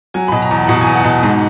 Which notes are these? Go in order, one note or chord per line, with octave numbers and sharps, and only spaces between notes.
F#3 G#5
B2 B5
A#5
E2
B2 F#5
G#5
E2
F#5
B2
G#2